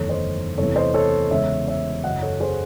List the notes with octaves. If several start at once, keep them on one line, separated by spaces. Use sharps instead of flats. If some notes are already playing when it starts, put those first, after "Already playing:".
Already playing: F#1 E2 D#3 A3 A4 C#5
C5 D#5
E2 C3 E3 A3 A4 C#5
C5 D#5
A4 C#5
E2 C#3 G#3 C#5 E5
C#5 E5
F#2 C#3 F#3 D#5 F#5
A4 C#5
G#4 C5